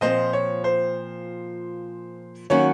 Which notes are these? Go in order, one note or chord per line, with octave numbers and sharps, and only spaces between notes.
A#2 F3 C4 C5 D#5
C#5
C5
D#3 F#3 A#3 C#4 F#4 C#5